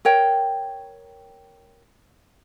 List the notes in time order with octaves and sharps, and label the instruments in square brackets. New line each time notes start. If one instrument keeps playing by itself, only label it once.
[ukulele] A#4 C#5 G5